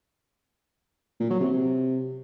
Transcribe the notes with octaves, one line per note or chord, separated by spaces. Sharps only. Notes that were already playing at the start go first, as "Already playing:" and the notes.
A#2
F#3
C3
C3